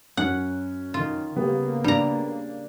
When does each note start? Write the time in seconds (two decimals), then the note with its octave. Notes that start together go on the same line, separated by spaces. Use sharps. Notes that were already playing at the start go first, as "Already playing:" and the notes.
0.17 F#2 C#4 F#5 F#6
0.94 D#3 F4
1.36 C#3 G3 A#3 B3 A#4
1.84 G3 D4 A#5